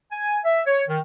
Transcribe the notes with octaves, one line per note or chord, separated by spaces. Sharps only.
G#5
E5
C#5
D#3